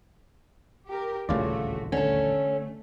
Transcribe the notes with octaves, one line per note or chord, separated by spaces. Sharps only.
G4 A#4
D#1 A1 D2 C#3 A3 F4 F#4 D5
D3 A3 C#4 A4